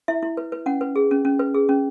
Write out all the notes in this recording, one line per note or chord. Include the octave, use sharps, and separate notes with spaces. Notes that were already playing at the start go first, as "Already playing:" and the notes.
E4 E5
E4
B4
B4
C#4 F#5
B4
G#4
C#4
C#4
B4
G#4
C#4